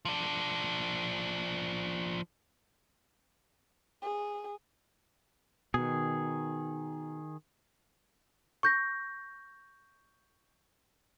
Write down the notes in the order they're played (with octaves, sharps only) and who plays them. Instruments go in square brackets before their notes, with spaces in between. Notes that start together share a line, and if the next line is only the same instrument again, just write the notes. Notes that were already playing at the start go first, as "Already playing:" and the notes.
[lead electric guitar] F3 D4
[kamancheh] G#4
[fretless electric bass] B2 [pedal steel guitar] D#3 G#4
[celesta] C#6 G6 A#6